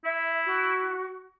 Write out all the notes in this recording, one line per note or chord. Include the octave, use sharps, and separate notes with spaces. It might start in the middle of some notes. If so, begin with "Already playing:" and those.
E4 E5
F#4